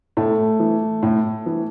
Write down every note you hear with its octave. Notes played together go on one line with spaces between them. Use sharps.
A2 A3
E3
A2
E3